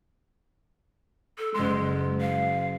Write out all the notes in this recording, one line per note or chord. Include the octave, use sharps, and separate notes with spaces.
A4
F#1 G#3 C6
F5